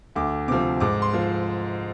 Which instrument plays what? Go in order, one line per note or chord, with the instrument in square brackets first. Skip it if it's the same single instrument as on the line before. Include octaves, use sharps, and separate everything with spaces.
[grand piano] D2 D6
C3 F3 D6
G#2 D6
C6
F3